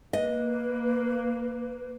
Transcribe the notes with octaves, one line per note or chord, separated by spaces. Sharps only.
A#3 B4 D#5